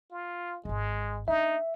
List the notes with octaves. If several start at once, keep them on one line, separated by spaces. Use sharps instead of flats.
F4
D1 G#1 G#3
A#3 D4 D#4 E5